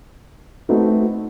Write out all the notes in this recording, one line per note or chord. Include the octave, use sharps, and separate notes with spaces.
A3 C4 D#4 F#4 B4